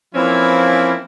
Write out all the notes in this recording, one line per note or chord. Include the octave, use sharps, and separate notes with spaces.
E3 F3 A#3 C4 C#4 E4